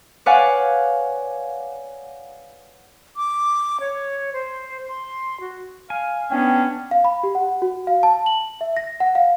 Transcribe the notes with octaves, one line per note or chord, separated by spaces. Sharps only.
B4 C#5 D5 F5 F#5 G#5
D6
C#5
C5
C6
F#4
F5 G#5
B3 C#4 D4 G5
F5
B5
G4
F#5
F#4
F5
A5
F#7
E5
A#6
F#5
F5